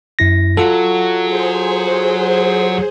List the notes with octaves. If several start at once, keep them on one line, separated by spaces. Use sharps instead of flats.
F#2 E4 A#6
F#3 F4 A4
G#4 C5